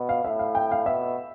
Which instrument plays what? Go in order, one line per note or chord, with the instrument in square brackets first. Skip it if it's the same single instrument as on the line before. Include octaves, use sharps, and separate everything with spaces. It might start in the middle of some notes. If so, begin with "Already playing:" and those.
Already playing: [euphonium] B2
[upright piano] F5
[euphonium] A2 [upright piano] E5
[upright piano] F5
G5
F5
[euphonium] B2 [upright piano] E5